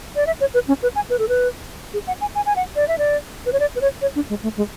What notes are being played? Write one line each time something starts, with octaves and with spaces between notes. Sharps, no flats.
D5
E5
C#5
B4
C#4
B4
G#5
B4
A4
B4
G#4
F#5
G#5
G#5
G#5
F#5
D5
E5
D5
B4
C#5
D5
B4
C#5
C#5
D4
G#3
A3
G#3